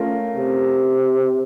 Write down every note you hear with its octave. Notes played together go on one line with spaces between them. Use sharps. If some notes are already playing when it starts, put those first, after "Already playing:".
Already playing: A3 C#4 F4 A#4
C3